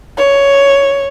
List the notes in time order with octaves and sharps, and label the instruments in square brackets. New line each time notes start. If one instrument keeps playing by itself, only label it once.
[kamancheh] C#5